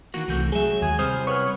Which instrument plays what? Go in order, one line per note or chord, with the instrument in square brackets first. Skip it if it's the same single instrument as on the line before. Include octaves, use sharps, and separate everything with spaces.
[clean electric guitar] D#3 E3 A#3 [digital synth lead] F#4
[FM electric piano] C2 G6 [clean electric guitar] E3 A3 C4
[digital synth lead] F#3 [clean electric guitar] G#3 E5 [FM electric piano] G#4
[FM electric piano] D#2 [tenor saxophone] G#4
[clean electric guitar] C3 G3 C4 [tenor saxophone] C5 [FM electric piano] D#6 [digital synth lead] F6
[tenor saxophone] B3 [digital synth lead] C#5 [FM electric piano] C#6 F6